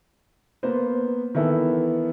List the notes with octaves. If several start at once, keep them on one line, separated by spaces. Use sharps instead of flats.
A#3 B3 C5
D#3 E3 B3 E4 A4